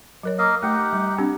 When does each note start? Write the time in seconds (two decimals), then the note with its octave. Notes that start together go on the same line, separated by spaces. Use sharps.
0.23 F#3 A#4 C#5
0.38 A#3 D#5 F5
0.63 A3 D#4 G4 F#5
0.93 G3
1.18 C4 D4 G4